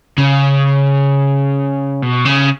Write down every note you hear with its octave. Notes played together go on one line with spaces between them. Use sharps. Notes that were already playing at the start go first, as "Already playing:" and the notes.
C#3
B2
C#3